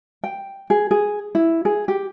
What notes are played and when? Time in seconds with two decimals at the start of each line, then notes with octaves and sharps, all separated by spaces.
0.24 G5
0.70 G#4
0.91 G#4
1.35 E4
1.65 G#4
1.88 G4